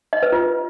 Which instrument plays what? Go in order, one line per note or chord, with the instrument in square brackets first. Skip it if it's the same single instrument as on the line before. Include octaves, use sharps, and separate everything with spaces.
[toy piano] D#5
B4
F4